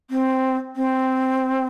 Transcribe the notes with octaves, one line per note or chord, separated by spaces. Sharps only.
C4
C4